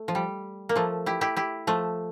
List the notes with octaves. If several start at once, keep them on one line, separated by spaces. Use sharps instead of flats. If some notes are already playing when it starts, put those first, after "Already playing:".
Already playing: A3
F3
G3
A#3
F3 A3
E4 G4
E4 G4
E4 G4
F3 A3